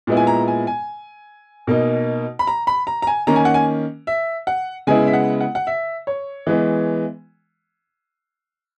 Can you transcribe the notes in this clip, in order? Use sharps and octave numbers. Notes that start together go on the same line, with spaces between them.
A#2 G#3 B3 E4
G#5
A#5
G#5
G#5
B2 A#3 D#4
B5
A#5
B5
A#5
A#5
G#5
D#3 A#3 C#4 A#5
G#5
F#5
G#5
E5
F#5
C#3 G#3 B3 E4 G#5
E5
F#5
F#5
F#5
E5
C#5
E3 G#3 B3